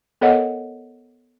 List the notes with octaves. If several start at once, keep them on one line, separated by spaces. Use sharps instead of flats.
B3 A4 A#4 C#5 D#5 F#5